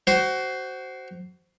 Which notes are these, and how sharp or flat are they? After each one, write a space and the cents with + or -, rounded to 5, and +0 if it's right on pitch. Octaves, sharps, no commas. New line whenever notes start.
F#4 +20 C5 +0